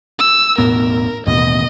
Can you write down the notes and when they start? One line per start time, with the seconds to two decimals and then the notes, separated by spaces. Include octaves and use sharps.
0.19 E6
0.58 E1 A2 B3 A#4
1.27 A1 D#2 B2 D#5